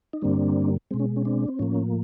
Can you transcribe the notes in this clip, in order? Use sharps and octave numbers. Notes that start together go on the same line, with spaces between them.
D#4
G2 D3 G3 A#3 C4 D4
B2 G#3 C4
C#4
C#4
C4 D4
C4
A2 F3 A#3 C#4